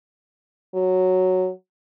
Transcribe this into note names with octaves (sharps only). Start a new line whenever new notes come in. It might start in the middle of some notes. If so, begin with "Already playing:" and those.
F#3